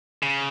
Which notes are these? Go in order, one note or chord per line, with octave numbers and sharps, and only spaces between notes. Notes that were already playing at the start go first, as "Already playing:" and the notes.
C#3